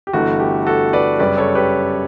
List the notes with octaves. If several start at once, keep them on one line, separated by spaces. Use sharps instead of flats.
G4
G1 G2 E3 A3 F#4
G4
F#4 A4
B4 D5
F#2 C#3 G3 B4 D5
A4 C#5
G4 B4